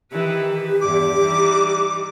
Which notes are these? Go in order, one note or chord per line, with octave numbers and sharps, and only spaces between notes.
D#3 E3 G4 B4
E2 G2 D6
E3 G3 D#4